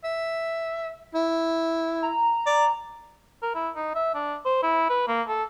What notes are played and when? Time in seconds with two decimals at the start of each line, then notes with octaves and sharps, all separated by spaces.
0.04 E5
1.14 E4
2.03 A#5
2.46 D5
3.42 A#4
3.55 E4
3.76 D#4
3.95 E5
4.15 D4
4.46 C5
4.63 E4
4.90 B4
5.08 A#3
5.28 A4